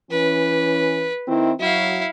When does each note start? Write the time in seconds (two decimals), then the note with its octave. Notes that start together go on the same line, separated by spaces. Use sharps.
0.11 E3 C#4 B4
1.28 D#3 C4 E4
1.60 F#3 E4 F#4 F5